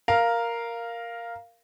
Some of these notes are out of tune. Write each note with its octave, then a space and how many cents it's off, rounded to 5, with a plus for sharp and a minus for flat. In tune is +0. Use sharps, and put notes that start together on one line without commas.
A#4 +0 F5 -5